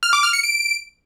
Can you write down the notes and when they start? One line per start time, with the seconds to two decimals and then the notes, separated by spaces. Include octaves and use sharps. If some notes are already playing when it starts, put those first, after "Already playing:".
0.03 F6
0.13 D6
0.23 F6
0.33 C#7
0.43 D7